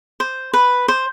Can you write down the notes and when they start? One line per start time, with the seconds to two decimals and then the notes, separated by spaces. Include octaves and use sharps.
0.20 C5
0.53 B4
0.88 C5